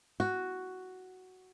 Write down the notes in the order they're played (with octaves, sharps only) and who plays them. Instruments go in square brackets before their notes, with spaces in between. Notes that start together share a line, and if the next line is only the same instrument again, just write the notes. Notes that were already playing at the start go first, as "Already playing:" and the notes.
[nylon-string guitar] F#4